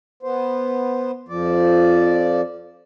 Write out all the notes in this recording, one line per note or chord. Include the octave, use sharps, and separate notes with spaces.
B3 C5
F2 F3 D5